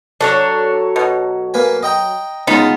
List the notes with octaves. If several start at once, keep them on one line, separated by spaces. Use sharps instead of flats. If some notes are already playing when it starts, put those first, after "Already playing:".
F#3 D4 A4 C#5
B2
A#3 B4 G#5
D#5 G5 A#5
C#3 G#3 B3 D#4 F4